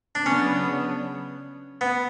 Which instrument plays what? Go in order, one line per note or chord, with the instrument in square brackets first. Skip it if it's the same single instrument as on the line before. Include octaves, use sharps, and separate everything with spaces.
[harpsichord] D4
[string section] C#3 F#3 B3 D4 [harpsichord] C#4
[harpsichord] B3